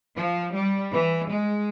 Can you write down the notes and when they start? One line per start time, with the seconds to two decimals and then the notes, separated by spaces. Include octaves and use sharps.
0.16 F3
0.55 G3
0.93 E3
1.29 G#3